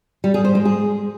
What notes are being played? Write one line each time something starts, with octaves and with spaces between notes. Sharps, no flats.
G3
G#4
C5
G#3
G#4